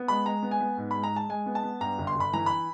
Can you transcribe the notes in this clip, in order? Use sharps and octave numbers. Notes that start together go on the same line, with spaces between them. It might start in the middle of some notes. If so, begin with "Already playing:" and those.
Already playing: B3
G#3 B5
G#3 A#5
B3
G#5
B3
G#2
G#3 B5
A#5
G#3 A5
G#3 G#5
B3
A5
B3
G2 A#5
G1
C6
G1 B5
E3 A#5
B5